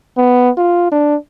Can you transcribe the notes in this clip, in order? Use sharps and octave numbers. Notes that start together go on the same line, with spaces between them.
B3
F4
D4